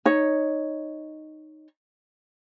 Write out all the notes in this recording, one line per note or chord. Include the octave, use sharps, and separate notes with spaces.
D#4 C#5